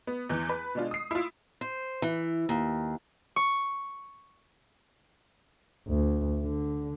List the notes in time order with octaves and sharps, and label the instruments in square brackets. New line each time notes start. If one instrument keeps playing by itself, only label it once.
[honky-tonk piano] B3
E2 E3
B4
B2 G#3 D4 F4
D#6 C7
E4 F4
[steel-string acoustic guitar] C5
E3
D#2
[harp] C#6
[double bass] D2
D3